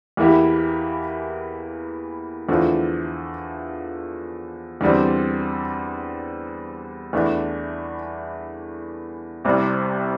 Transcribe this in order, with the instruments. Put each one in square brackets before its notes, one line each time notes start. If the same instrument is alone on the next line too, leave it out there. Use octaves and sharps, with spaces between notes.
[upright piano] E2 E3 A#3 E4 G4
E2 D3 F3 A3
E2 D3 G3 C4
E2 E3 A3 D4
C2 C3 G3